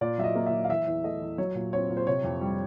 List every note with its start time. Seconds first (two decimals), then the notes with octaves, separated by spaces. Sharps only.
0.01 A#2 D5
0.18 F#3 E5
0.24 D#5
0.35 A#3
0.46 E5
0.53 A#2
0.64 F5
0.69 E3 E5
0.87 E2
1.04 A3 D#5
1.21 E2
1.38 F#3 C#5
1.55 A#2
1.73 C4 C#5
1.90 A#2
1.97 C5
2.07 C3 C#5
2.24 F2
2.41 G3